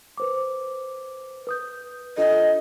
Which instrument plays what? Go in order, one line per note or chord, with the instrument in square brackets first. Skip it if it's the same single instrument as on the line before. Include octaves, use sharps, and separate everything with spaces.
[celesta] B4 C5 D6
B4 D#6 G6
[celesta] D4 F4 A4 [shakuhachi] D#5